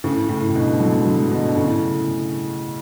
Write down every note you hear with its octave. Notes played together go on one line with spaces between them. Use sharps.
A2 C#3
A2
A2
G2 B2
D3 F#3
D3 F#3
B2 D3
A2 C#3